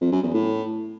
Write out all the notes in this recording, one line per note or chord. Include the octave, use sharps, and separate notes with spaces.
F2
F#2
E2
A2